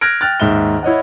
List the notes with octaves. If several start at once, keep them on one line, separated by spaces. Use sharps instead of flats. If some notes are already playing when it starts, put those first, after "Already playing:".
F6 F#6 G#6 A#6 D7
G5 F6 F#6 A6
D#2 G#2 E5 G7
E4 C#5 D#5 F#5